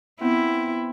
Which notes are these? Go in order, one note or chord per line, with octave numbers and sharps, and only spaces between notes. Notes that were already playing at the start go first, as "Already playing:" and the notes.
B3 C4 E4